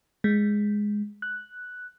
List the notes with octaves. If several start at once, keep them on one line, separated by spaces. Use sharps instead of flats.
G#3
F#6